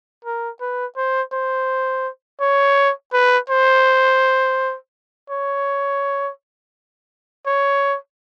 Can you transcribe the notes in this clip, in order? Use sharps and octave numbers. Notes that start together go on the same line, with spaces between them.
A#4
B4
C5
C5
C#5
B4
C5
C#5
C#5